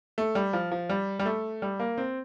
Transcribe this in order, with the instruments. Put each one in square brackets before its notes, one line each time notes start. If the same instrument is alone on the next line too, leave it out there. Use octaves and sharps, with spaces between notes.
[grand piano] A3
G3
F3
F3
G3
G3
A3
G3
A#3
C4